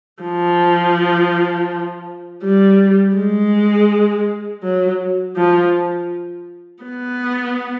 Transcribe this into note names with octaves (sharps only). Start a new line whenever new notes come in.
F3
G3
G#3
F#3
F3
B3